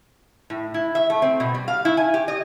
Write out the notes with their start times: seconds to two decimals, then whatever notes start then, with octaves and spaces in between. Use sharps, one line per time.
0.50 A2
0.74 E4
0.95 E5
1.10 A3
1.22 C4
1.40 B2
1.54 G3
1.68 F5
1.85 E4
1.97 G#5
2.14 G4
2.28 D#5